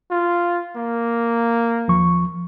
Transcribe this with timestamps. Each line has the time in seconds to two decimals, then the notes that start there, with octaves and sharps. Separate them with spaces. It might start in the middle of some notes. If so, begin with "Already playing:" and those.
0.11 F4
0.76 A#3
1.88 D#2 F3 C#6